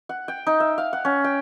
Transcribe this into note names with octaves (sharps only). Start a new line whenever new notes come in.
F#5
G5
D#4
E5
F5
F#5
C#4
G5